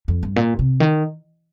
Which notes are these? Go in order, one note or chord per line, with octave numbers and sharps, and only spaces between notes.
F2
G2
A#2
C3
D#3